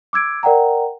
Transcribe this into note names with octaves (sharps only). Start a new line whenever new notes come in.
D6 E6 G#6 D7
A#4 D5 F#5 G5 A#5